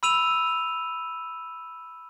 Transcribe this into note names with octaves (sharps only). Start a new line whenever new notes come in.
B5 E6 D#7 F7